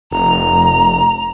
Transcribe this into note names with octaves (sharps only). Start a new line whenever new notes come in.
F1 A#5